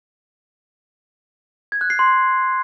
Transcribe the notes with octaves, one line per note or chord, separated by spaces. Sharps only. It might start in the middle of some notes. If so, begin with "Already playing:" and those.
G#6
F#6
C7
C6